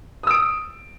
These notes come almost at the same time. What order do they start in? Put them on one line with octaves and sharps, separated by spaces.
D#6 E6 D7